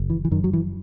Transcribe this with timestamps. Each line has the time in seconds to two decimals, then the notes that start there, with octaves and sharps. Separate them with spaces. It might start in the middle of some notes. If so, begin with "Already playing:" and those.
Already playing: F#1
0.10 E3
0.25 E3
0.31 F#2 D#3
0.44 F#3
0.53 E3